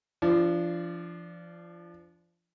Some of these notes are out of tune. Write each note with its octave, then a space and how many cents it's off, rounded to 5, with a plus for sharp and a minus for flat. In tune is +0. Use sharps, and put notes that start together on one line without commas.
F3 -30 D4 -5